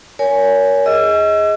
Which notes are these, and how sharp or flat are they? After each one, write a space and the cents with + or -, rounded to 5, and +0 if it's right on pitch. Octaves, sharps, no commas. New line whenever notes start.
A#4 +0 C#5 +30 G#5 +0
G#4 -5 D#5 +30 E6 +40